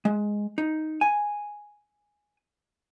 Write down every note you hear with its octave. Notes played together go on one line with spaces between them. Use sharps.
G#3
D#4
G#5